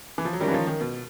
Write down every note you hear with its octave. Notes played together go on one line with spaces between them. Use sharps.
E3
F3
F#3
D#3 G3 G#3 C#4 F4 A#4
E3
F3
D#3
B2